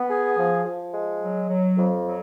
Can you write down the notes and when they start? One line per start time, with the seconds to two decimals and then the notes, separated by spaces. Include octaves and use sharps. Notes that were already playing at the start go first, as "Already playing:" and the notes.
Already playing: B3
0.10 G#4
0.38 F3
0.66 F3
0.94 G#3
1.21 F#3
1.49 F#3
1.77 F2
2.05 F#3